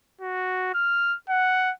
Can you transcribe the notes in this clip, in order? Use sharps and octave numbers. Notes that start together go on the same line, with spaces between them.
F#4
F6
F#5